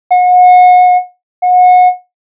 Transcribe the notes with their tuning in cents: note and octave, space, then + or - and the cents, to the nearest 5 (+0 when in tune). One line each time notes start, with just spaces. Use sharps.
F#5 -35
F#5 -30